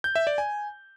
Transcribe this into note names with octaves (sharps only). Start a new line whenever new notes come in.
G6
E5
D5
G#5